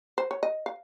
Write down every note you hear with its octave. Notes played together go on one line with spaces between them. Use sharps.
C5
C#5
D#5
F5